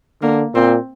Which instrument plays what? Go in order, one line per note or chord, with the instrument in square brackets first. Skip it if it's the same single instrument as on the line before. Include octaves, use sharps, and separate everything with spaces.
[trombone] D3 [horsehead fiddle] A#3
[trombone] A#2 [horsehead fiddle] C4